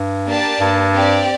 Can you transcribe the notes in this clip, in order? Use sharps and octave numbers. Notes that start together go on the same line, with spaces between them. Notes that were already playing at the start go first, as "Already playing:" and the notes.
Already playing: G2
A#3 D4 G4 D5 A5
G2
C4 G4 D5